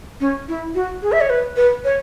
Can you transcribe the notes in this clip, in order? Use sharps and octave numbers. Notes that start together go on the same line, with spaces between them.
C#4
E4
F#4
G#4
E5
C#5
B4
B4
C#5